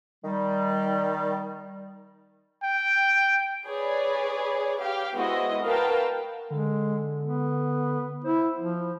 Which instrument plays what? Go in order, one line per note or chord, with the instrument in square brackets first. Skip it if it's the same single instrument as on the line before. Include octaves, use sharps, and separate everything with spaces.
[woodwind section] D#3 G3
[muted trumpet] G5
[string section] G#4 B4 C#5 D5
G4 F5 G5
G#3 B3 E4 F#4 C5 D#5
F#4 A#4 B4 F5 G5 A5
[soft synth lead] D3 [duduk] G#3
[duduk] B3
[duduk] E4 [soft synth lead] C5
[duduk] F3